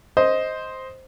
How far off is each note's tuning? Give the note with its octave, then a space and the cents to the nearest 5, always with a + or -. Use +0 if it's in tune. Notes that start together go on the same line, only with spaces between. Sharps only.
C5 +0 D#5 +10